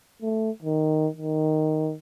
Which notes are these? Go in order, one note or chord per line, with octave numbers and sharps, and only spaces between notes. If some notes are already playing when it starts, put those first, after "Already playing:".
A3
D#3
D#3